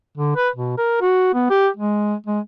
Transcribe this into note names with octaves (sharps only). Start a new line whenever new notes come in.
D3
B4
B2
A#4
F#4
B3
G4
G#3
G#3